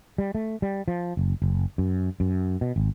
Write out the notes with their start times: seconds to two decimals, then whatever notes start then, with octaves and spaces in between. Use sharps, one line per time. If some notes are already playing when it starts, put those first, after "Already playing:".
0.18 G3
0.35 A3
0.62 G3
0.88 F3
1.17 F#1
1.42 F#1
1.78 F#2
2.20 F#2
2.61 B2
2.76 G#1